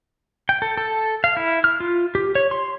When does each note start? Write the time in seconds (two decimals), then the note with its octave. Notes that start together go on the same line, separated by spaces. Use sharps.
0.49 G5
0.62 A4
0.78 A4
1.24 F5
1.37 E4
1.64 F6
1.80 F4
2.15 G4
2.35 C#5
2.51 C6